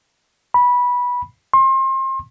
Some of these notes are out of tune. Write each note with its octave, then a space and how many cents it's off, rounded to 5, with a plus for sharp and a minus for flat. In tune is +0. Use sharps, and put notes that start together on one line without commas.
B5 -15
C6 +35